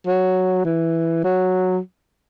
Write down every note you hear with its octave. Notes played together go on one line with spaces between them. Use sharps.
F#3
E3
F#3